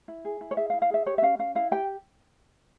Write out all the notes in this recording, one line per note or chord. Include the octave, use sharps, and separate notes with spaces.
E4
G#4
E4
C#5
G#4 E5
F5
E4
F5
G#4 E5
G4 C#5
E5
C#4 F5
C#4 F5
E4 F5
G4 G5